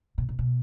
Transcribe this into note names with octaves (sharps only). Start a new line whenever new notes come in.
B2
A#2
B2